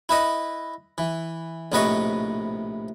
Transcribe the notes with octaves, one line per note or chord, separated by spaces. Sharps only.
E4 B4 D#5
E3
A#1 A2 C3 B4 D#5 C#6